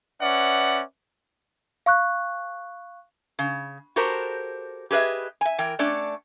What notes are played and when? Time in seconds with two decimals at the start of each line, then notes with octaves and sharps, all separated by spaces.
0.22 C#4 B4 D5 E5 F#5
1.86 F5 C#6 F#6
3.39 C#3
3.96 F#4 G4 A4 A#4 C5
4.91 G4 G#4 B4 D#5 E5
5.41 E5 G#5
5.58 E3 A#4 G5
5.79 A3 C#4 D4 D5